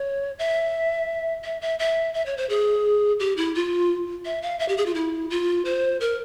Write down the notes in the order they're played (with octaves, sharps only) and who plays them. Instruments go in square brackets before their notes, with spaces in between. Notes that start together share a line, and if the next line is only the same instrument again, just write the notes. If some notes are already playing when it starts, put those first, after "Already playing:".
Already playing: [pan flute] C#5
E5
E5
E5
E5
E5
C#5
C5
G#4
G4
E4
F4
E5
F5
E5
G4
G#4
F4
E4
F4
C5
A#4